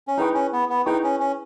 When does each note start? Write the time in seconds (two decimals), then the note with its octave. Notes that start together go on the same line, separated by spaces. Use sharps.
0.08 C#4
0.17 D#4 E4 G#4 B4 G5 C#6
0.34 C#4
0.53 B3
0.70 B3
0.86 D#4 E4 G#4 B4 G5 C#6
1.04 C#4
1.20 C#4